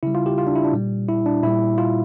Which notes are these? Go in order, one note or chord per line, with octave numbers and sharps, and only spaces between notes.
C#3 G3 E4
F4
G4
F4
D4
E4
D4
A#2 G3
E4
D4
A#2 G3 E4
F4